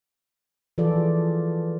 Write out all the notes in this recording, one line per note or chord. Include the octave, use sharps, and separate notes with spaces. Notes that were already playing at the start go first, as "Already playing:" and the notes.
E3 F3 F4 G#4 A4 D5